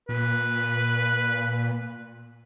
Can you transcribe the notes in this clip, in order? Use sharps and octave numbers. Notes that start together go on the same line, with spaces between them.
A#2 B4